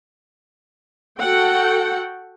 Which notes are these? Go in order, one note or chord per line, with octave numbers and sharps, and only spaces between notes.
F#4 A4 F#5 G5